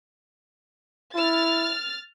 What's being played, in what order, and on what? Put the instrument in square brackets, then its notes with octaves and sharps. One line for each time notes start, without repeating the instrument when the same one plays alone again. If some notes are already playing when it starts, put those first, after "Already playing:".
[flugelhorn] E4 [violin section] F6 A6